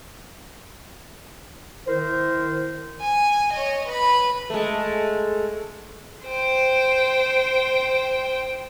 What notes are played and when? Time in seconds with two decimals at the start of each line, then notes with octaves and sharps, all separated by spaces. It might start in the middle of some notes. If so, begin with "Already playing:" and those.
1.87 D#3 E4 A#4 C5
3.01 G#5
3.52 C#5 D#5
3.87 B4 B5
4.50 G#3 A3
6.26 C5 G5